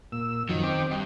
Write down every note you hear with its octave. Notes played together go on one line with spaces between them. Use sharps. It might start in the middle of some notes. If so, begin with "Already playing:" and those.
A#2 E6
F#2 D#3 F3
C4 G5 D6
G2 D#5 G5